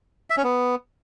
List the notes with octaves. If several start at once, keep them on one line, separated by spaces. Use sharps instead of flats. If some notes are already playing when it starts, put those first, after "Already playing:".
E5
C#4
B3